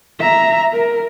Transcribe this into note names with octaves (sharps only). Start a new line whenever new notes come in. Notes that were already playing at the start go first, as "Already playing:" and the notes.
E5 A#5
A#4